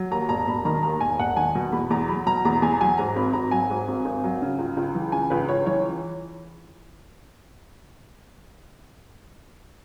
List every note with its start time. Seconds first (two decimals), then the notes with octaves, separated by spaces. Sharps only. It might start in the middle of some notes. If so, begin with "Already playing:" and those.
Already playing: F#3
0.11 D#2 A#5
0.29 E1 A#5
0.47 E1 B5
0.65 D#3 A#5
0.83 D#2 A#5
1.01 E1 G#5
1.19 E1 F#5
1.37 D#3 G#5
1.55 B2
1.72 E2 B5
1.90 E2 A#5
2.08 F#3 B5
2.26 B2 A#5
2.45 E2 A#5
2.62 E2 G#5
2.81 F#3 G#5
2.97 G#2 A#5
3.16 G#1 B5
3.33 G#1 A#5
3.51 F#3 G#5
3.70 G#2
3.88 G#1
4.05 G#1
4.24 F#3
4.42 C#3
4.59 C#2
4.77 C#2
4.95 E3
5.12 C#3 G#5
5.30 C#2 B4
5.49 C#2 C#5
5.66 E3 C#5